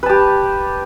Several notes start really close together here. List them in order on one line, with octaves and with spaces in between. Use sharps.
B4 A5 G4